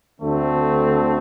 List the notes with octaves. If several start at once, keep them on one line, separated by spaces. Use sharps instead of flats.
D2 D3 A3 C4